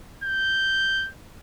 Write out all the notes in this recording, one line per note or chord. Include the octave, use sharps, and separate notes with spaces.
G6